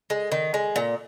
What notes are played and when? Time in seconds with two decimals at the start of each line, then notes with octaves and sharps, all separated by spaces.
0.10 G#3
0.32 D#3
0.54 G#3
0.76 A#2